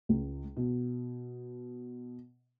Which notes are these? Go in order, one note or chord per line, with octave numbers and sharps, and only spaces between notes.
C#2
B2